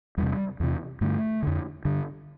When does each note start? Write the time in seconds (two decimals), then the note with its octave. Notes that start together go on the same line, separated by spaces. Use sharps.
0.17 E2 G3
0.23 C3
0.60 E2 C3
1.01 G2 D3 A3
1.43 F2 D3
1.85 G2 D3